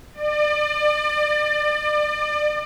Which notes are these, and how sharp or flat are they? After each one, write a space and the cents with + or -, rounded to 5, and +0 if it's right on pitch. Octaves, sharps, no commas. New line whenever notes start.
D5 +35